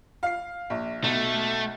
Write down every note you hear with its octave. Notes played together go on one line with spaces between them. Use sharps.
F5 C7
A#1
B1 A3